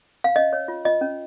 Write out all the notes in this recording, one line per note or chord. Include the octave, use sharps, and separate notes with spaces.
F5
C#4 D#5
C#5
F4
F4 D#5
C#4